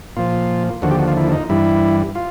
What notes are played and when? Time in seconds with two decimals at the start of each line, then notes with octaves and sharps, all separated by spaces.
0.17 A#2 F3 F4
0.82 D#2 D3 F3 F#4
0.91 G4
0.99 F#4
1.08 F4
1.16 E4
1.32 D#4
1.49 G2 E3 G3 E4
2.15 F4